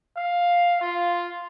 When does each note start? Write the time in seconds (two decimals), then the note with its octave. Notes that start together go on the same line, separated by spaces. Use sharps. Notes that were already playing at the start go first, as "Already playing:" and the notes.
0.17 F5
0.81 F4